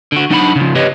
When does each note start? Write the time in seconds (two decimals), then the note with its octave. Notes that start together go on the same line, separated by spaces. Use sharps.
0.12 D3 F#4
0.30 F#3 D4 D#4 F#5 G5 B5
0.56 C#3 F3
0.75 G4 B4 C#5 D#5